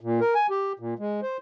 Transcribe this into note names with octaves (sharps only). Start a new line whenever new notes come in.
A#2
A#4
G#5
G4
A#2
G#3
C5